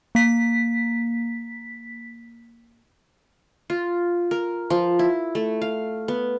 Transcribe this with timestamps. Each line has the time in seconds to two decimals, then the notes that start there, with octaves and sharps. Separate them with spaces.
0.15 A#3 B6
3.70 F4
4.31 A#4
4.70 F3
4.99 E4
5.35 A3
5.62 F5
6.08 B3